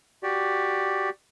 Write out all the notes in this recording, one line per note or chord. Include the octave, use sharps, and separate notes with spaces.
F#4 G4 D5